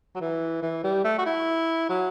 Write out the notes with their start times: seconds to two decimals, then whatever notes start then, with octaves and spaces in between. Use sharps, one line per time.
0.15 F#3
0.21 E3
0.62 E3
0.84 G3
1.04 A3
1.18 F#4
1.26 E4
1.89 F#3